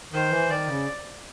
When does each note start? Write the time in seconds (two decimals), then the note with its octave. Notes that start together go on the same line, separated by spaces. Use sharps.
0.13 D#3 C5
0.31 E3
0.49 D#3 D5
0.67 C#3